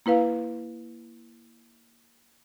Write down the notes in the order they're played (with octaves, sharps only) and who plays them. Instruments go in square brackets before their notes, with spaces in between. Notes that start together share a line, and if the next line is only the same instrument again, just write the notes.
[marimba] A#3 E4 B4 F5